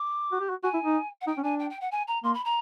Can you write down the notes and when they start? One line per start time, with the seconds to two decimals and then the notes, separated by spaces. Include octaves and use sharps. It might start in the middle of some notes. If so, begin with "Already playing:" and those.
Already playing: D6
0.32 F#4
0.40 G4
0.50 F#4
0.63 F#4 G#5
0.74 E4
0.85 D#4
1.21 F#5
1.27 D#4 G5
1.37 C#4
1.43 D4 G#5
1.59 G5
1.70 G5
1.81 F#5
1.91 G#5
2.07 A#5
2.23 A#3 C6
2.34 B5
2.45 A#5